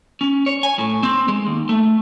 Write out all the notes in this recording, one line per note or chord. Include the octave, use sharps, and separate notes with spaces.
C#4
C#5
G#5
A2
C4
G#3
D#2
A3